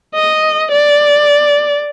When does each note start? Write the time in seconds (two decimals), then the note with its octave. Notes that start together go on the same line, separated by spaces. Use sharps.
0.15 D#5
0.71 D5